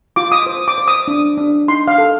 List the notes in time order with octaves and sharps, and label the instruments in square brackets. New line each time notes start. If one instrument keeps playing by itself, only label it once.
[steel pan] F4 D6
D#6
C5
D6
C5
D#6
D4
D4
D#4 C6
F5
A4